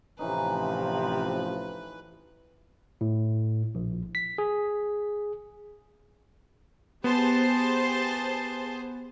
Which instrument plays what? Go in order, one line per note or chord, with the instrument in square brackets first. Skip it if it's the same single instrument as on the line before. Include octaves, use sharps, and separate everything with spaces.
[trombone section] A1 F3 [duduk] C3 [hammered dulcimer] E3 C#4 D#4 [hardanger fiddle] B4
[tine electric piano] A2
A#1
B6
G#4
[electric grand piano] B3 [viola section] G4 A5 C6 [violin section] G#4 C5